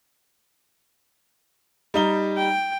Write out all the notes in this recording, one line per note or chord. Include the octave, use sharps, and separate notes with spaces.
G3 D#4 G7
G5